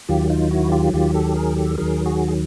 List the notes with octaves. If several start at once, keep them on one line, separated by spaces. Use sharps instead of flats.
D#2 D#3 F#3 F4 G4
D#4 F4
E4 F#4
F4 G4
D#2 D#3 F#3 F4 G4
G4 A4
G#4 A#4
G4 A4
D#2 D#3 F#3 G#4 A#4
F#4 G#4
G#4